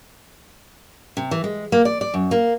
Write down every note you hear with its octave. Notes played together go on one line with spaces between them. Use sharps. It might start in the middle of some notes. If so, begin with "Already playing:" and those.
C3
E3
G#3
A#3
D5
D5
F#2
A#3